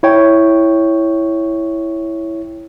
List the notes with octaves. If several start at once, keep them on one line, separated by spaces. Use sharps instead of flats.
E4 C#5 G5